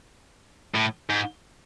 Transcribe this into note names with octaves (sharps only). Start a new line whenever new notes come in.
A2
G#2